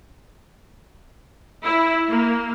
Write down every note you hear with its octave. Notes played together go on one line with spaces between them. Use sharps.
E4
A#3